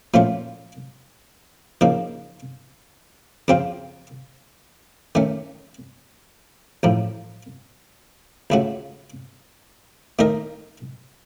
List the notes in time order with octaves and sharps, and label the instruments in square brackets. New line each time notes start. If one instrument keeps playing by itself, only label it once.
[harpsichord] A#2 F3 A3 C#4 F4
C#3 F3 A#3 D#4
F2 C#3 F3 C4 F4
D#3 A3 C#4
A1 A2 F3
C#2 C#3 A3 C#4 F#4
D#3 A3 D#4 A#4 D#5